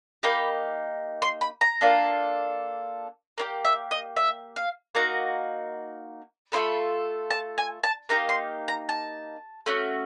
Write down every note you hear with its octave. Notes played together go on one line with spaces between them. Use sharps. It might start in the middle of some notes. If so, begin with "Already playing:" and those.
A#3 D#4 G4 B5
C6
B5
A#5
A#3 D4 F4 A4
A#3 D4 G4
E5
D#5
E5
F5
A#3 D#4 F#4 A#5
A3 C4 F4 A4 B5
A5
G#5
A5
A#3 D#4 G4 A#5
C6
A#5
A5
A3 C#4 F#4